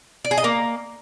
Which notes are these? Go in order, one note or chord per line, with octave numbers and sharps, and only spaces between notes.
D5
G#4
D#5
A#3